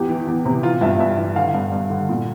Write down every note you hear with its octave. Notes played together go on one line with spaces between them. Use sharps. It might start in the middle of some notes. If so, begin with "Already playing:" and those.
Already playing: E2 G4
E3
E2
C3
E3 F4
G2 E5
G2 E5
E3
D3 F5
G2
G2
D3
A#2